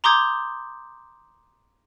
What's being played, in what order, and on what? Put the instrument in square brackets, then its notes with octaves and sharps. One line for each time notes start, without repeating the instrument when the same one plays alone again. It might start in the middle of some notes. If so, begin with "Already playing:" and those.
[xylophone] A#5 C6 D6 D#6 G6 G#6